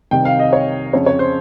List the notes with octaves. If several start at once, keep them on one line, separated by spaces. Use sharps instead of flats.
C2 C3 D#3 G5
F5
D#5
C#5
F2 C#3 C#5
C#5
C5